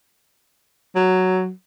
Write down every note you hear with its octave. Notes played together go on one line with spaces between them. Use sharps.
F#3